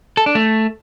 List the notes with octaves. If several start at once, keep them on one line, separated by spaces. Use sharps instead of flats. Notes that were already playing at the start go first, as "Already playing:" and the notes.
A4
D4
A3